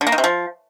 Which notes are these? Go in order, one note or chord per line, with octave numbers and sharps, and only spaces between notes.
D3
A#3
D#3
C3
F3